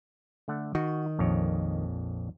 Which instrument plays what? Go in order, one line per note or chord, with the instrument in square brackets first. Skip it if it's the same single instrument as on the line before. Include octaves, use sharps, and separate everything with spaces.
[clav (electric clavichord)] D3 A3 F#5
[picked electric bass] D#3 [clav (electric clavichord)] F#4
[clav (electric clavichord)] A#1 F2 C#5